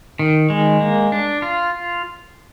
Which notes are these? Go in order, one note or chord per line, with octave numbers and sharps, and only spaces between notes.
D#3
G#3
A#3
D4
F4